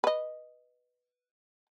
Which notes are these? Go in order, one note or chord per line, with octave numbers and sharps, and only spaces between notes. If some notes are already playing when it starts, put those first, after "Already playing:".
B4 D#5